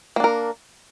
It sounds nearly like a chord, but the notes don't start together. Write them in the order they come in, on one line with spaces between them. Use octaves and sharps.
A#3 D4 A#4